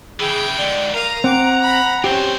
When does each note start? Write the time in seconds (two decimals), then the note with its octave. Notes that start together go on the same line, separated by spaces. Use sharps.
0.20 C#3 E3 G#4 G5
0.58 G#2 D3 D5
0.94 A#4 F5 A#5 D#6
1.24 C4 F#5 D6
1.62 B5
2.04 G2 C4 C#4 G4 C5